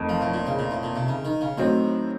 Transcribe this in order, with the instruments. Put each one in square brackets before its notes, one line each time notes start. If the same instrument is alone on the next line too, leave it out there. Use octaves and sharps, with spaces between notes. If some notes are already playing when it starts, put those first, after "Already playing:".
Already playing: [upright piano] F2 D#3 A3 D#4
[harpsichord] F3
A2
A#2
C#3
A#2
A2
A#2
C3
C#3
D#3
C#3
[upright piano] A2 F#3 C4 [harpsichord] D#3